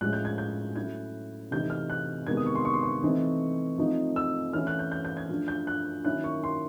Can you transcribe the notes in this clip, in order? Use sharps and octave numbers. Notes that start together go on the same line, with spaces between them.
A2 F3 G#3 C#4 F#6
G6
G#6
G6
F#3 A3 C#4 E4 G#6
C3 E3 A3 C4 D#4 G6
F6
F#6
C3 D#3 G#3 B3 G#6
D#6
C#6
C6
C#6
C6
C#6
E3 A3 C4 D#4
F3 A3 C4 D#4
E6
E3 A3 C#4 E4 F6
F#6
G6
G6
G6
G#6
F3 A3 D4
G6
F#6
D#3 F#3 A#3 C#4 E4 F#6
C#6
C6